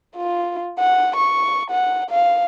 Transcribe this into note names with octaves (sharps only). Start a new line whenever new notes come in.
F4
F#5
C#6
F#5
F5